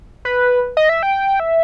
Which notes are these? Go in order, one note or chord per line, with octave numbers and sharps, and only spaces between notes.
B4
D#5
E5
G5
E5